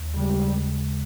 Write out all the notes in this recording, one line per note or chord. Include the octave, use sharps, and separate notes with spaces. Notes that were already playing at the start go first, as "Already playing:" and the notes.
Already playing: D#2
C#3 G3 G#3